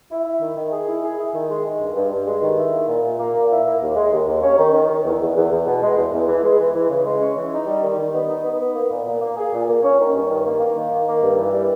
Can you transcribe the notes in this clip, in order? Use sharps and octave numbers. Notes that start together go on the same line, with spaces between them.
E4
E4
D#3
D#3
G#4
E4
G#4
E4
D#3
G#3
G#3
G2
G2
G2
G#3
D#3
E4
A#3
A#2
A#2
A#3
A#2
E4
A#3
D#2
G#3
D#2
D#2
C#4
D#3
D#3
D#3
E2
E2
E2
E2
B2
G#3
E2
E2
E3
G#3
E3
E3
C#3
G#3
C#4
E3
D#4
G3
D#3
D#3
B3
D#4
B3
B3
A#3
A#2
A#2
A#3
G#4
A#2
A#3
C#4
D#3
G2
D#3
A#3
A#3
D#3
D#3
A#3
G2
E3
G3